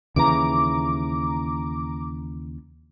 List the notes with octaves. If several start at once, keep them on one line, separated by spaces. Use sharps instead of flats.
D#2 C#3 E3 A#5 D6